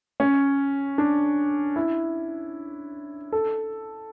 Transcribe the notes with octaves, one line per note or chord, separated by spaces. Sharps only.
C#4
D4
E4
A4